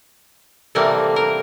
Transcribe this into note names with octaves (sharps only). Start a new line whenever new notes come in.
C3 E3 G3 A3 A#3
A#4